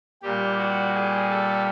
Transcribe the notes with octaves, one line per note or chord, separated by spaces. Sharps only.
A#2 G3 G4
F#4
G#4
A4